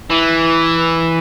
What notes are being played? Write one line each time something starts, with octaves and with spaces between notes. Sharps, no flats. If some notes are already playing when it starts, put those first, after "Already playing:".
E3